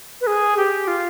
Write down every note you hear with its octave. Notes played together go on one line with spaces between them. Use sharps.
B4
G#4
G4
F4